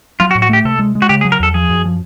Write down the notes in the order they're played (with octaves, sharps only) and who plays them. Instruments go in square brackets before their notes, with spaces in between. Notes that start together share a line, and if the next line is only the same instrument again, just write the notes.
[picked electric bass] F#3 [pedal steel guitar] F4
[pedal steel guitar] F#4
[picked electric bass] A2
[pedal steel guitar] F#4
[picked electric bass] A3 [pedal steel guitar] G4
[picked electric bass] C3 [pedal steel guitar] A4
[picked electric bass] G#3
G#3
[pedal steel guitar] F#4
[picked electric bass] C#3 [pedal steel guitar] G4
[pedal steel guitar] G#4
[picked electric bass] F#3
[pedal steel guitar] A#4
[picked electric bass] E2 [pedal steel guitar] A4
[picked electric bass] F3 [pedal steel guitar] G#4
[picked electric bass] F#2
F3